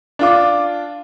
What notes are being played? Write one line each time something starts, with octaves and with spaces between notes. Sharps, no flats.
D4 F4 D6